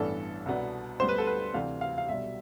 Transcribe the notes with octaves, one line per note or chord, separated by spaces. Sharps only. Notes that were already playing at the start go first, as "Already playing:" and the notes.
Already playing: A1 G2 E3 B3 D4 A4
C2 B2 B3 D4
D2 D3 G3 B3 D4 C5
B4
A4
B4
D2 C3 E3 A3 D4 F5
F5
F5
B1 B2 G3 D4 E5